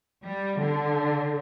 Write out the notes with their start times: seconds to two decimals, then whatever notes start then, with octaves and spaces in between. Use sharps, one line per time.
0.24 G3
0.60 D3